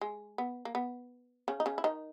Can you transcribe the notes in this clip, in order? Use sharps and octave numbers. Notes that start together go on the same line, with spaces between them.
G#3
B3
A#3
B3
C#3 C#4
D#4
C#3 C#4
E4
D#3 D#4